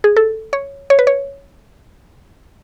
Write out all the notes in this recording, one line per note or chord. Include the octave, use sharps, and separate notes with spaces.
G#4
A4
C#5
C#5
B4
C#5